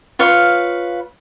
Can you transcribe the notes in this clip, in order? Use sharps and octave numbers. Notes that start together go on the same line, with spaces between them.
F4 B4 C#5 F5